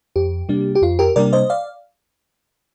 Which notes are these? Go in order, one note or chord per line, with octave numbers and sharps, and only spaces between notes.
F2 G4
C3 G3 A#3 D4
G4
F2 F4
G4 A#4
C3 G3 A#3 D4 A#4 D5
C5 D#5
D5 F5